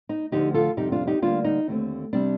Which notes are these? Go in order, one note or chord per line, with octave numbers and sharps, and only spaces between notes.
D#4
D2 D3 F3 A3 D#4 G4
F4 A4
F2 C3 G3 D#4 G4
D4 F4
D#4 G4
D2 D3 G3 A#3 D4 F4
D#4
D#2 D3 A3 C4
C3 G3 C4 D4